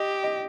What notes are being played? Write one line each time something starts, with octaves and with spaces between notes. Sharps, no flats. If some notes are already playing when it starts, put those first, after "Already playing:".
Already playing: G4 D#5
D#5